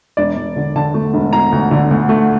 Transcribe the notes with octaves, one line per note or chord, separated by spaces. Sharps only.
E1 D5
E1
D3
D3 A5
A3
E1
E1 A#5
D2
D3
D2
A3